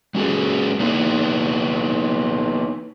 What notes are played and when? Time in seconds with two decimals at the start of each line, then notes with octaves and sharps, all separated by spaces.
0.15 G#3 C#4 F#4 G#4 A4
0.80 A#3 B3 D#4